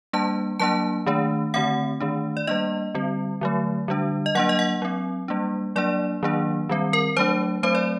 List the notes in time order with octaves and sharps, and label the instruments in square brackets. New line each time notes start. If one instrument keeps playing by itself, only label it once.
[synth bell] G3 A#3 D4 A5
F#3 A#3 D4 A5
D#3 A3 D4
D3 A3 C4 F#5
D#3 A3 D4
D5
G3 A#3 D4 D#5
D3 G3 C4
D3 F#3 A3
D3 G3 D4
D#5
F#3 A#3 D4 F#5
D#5
F#5
F#3 C4
G3 A#3 D4
F#3 A#3 D4 D5
D#3 F#3 A#3 D4
D#3 G3 C4
A#4
F#3 A3 D4 C5
F#3 A3 C4 C5
D5